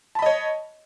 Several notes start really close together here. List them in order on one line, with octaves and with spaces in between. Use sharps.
A5 B5 D#5 C#5